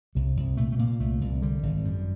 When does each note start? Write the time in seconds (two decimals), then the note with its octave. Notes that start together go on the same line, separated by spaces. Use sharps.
0.15 C2 G3
0.37 C2
0.57 A#2 A3
0.72 A3
0.78 A#2 A#3
1.00 C2 A3
1.21 C2
1.42 D3 G3
1.63 G#1
1.85 F#2